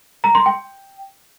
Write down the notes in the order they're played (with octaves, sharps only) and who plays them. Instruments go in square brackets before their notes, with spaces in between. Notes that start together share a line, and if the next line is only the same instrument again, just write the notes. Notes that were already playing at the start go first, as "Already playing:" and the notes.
[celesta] A#5
C6
G5